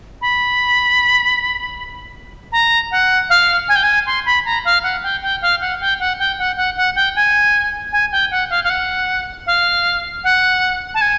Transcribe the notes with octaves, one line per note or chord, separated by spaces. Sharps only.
B5
A#5
F#5
F5
G#5
G5
G#5
C6
B5
A#5
F5
F#5
G5
G5
F5
F#5
G5
F#5
G5
F#5
F#5
F#5
G5
G#5
G#5
G5
F#5
F5
F5
F#5
F5
F#5
A5
G#5